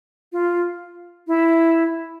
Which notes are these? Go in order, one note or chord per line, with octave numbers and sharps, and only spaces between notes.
F4
E4